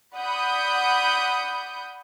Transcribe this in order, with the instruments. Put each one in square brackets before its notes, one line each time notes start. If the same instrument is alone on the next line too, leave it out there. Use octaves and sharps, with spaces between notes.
[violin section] D5 F#5 B5 D#6 G6